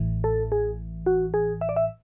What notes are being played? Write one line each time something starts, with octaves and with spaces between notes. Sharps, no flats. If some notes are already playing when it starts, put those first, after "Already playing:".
Already playing: A1 A2 E3
A4
G#4
F#4
G#4
E5
D5
E5